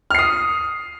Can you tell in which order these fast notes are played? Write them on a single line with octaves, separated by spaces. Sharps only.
F6 C7 D#6